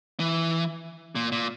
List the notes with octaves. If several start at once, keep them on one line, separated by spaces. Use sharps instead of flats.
E3
A#2
A#2